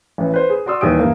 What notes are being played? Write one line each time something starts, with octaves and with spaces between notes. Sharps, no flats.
A1 E3
B4 C5
G#4
F#4 D5 C6 D#6 E6
D#2 E3 G3 G4 D#6 D7
G2 E3 A#3